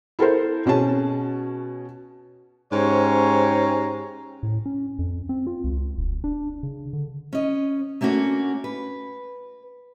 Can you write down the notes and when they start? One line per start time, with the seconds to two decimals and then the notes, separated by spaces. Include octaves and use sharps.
0.19 E4 A4 A#4 C5
0.66 B2 C#4 G#4 A5
2.73 G#2 C#4 G4 C5 C#5 A#5
4.43 A2
4.66 C#4
4.99 F2
5.29 C4
5.47 F4
5.64 C#2
5.97 D#1
6.24 D4
6.63 C#3
6.93 D3
7.33 C#4 D#5
8.01 A3 A#3 C#4 D4 F#4
8.64 B4